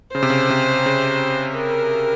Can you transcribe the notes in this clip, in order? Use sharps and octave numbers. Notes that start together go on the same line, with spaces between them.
C#3 C5
C3
C#3
C3
C#3
A#4